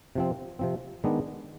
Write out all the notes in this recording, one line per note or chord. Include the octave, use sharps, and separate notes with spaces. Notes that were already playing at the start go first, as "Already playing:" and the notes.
C3 F3 C4
C3 F3 C4
D#3 G#3 B3 D4